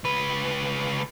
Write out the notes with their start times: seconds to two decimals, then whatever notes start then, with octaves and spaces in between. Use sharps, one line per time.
0.04 C#2 B4